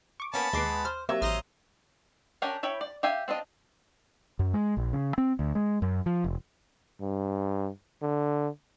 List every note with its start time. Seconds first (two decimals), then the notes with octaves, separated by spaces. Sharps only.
0.20 C#6 D6
0.34 A#3 B3 C#4 A5 B5
0.53 D#2 G#3 B3 D6 C7
0.85 C5 F6
1.09 F#3 A#3 C4 G4 E5
1.22 A1 C5 D#5 A#5 F6
2.42 C#4 D4 G4 A#4 D5
2.63 E4 C#5 G5 B5
2.81 D5
3.03 G4 E5 F5 G5 G#5
3.28 C4 D4 F4 D#5
4.39 F#2
4.54 G#3
4.77 A#1
4.93 C#3
5.18 C4
5.39 D2
5.55 G#3
5.82 F#2
6.06 F3
6.24 F1
7.01 G2
8.02 D3